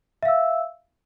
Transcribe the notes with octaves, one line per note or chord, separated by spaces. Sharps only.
E5 F5 E6